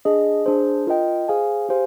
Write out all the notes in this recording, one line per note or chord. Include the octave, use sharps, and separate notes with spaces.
D4 G#4 D#5
D4 G#4 C5
F4 A#4 D#5 G5
G#4 C5 F5 G#5
G4 C5 F5 G#5